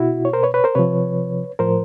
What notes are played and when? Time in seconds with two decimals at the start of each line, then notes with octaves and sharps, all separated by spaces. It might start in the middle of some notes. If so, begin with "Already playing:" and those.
Already playing: B2 E4 F#4
0.25 C#5
0.33 A#4 C5
0.43 B4 C#5
0.54 B4 C#5
0.64 A#4 C5
0.75 C3 F3 B4 C#5
1.59 A2 F3 A#4 C5